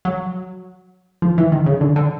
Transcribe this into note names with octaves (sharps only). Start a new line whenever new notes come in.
F#3
F3
E3
D#3
C#3
D3
D3